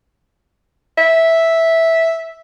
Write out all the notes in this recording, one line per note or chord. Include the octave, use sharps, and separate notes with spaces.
E5